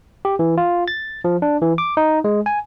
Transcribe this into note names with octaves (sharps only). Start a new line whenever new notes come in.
G4
E3
F4
A6
F3
D4
E3
D6
D#4
G#3
G#5